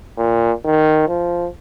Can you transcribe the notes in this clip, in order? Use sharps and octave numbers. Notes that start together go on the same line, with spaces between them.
A#2
D#3
F3